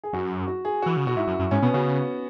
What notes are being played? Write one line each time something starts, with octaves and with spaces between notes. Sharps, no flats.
G#4
F#2 F#4
F#4
G#4
E3 F#4
C#3
B2 F#4
G#2 E4
F#2
F#2
G#2 C#4
B2 B3
C#3 F#4